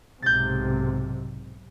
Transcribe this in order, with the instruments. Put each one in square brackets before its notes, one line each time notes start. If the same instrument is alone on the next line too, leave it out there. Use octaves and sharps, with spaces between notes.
[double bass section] B1 G#2 C3 [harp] G6 A6